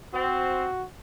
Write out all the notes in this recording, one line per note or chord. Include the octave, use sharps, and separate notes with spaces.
C4 F#4